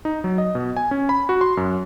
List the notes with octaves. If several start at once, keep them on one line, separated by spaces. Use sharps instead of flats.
D#4
F#3
D#5
B2
G#5
C#4
B5
F#4
C6
F#2